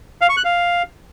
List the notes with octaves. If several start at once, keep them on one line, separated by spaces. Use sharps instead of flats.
F5
C#6
F#6
F5